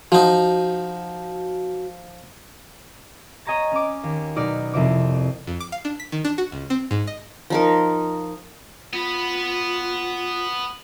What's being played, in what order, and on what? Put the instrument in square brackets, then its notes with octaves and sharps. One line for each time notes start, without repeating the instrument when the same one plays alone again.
[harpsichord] F3 D#4 [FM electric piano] F#4
[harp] C#5 D#5 G#5 A#5 C#6 A6
C#4 D6
D#2
B1 D#4 D5 F6
C2 F2 C3 D6
[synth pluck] F2
D6
F5
D4
B6
D#3
D4
F#4
C#2
C4
G#2
D#5
[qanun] F3 D#4 A#4
[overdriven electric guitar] B3 B5 [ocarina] F4